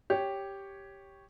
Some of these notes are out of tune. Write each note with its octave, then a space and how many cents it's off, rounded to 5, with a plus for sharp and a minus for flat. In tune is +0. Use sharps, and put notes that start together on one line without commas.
G4 +0 C#5 +0